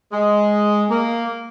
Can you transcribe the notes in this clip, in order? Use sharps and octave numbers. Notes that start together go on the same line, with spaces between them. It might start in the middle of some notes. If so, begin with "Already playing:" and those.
G#3
A#3